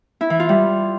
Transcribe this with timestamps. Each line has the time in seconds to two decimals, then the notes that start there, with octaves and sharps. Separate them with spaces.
0.21 E4
0.30 E3
0.40 F4
0.49 G3